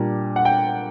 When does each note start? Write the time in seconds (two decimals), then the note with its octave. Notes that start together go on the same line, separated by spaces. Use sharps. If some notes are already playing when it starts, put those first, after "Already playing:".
Already playing: A#2 G3 D4
0.36 F#5
0.45 G5